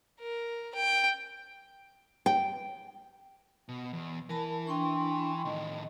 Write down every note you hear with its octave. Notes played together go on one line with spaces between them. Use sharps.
A#4
G5
G5
B2
E2
E3 A#4 A5 B5
D4 G5 C6 C#6
A2 D#3 D#5